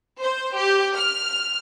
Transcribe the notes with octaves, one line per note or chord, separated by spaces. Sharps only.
C5
G4
F6